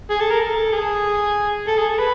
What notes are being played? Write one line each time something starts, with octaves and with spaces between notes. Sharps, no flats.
G#4
A4
A#4
A4
G#4
A4
G#4
A4
B4